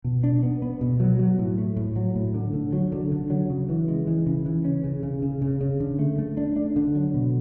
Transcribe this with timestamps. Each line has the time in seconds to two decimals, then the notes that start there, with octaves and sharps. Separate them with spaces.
0.04 B2
0.24 D4
0.43 B3
0.62 B3
0.81 B2
1.00 F#3
1.19 F#3
1.39 A2
1.58 A3
1.77 A2
1.96 F#3
2.16 A2
2.34 D3
2.54 D3
2.73 F#3
2.92 D3
3.12 D3
3.30 F#3
3.50 C#3
3.69 E3
3.88 G#3
4.07 E3
4.27 C#3
4.46 E3
4.65 C#4
4.84 C#3
5.03 C#3
5.22 C#3
5.42 C#3
5.61 C#3
5.80 D3
5.99 A3
6.18 A3
6.37 D4
6.56 D4
6.76 D3
6.95 F#3
7.14 B2